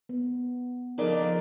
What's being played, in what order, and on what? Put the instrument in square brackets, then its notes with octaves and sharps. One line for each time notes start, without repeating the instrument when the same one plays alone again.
[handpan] B3
[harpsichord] F2 C#3 [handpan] D#4 A#4 D5